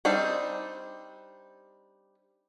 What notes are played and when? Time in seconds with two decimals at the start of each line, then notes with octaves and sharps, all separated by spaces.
0.05 G3 C4 D4 D#4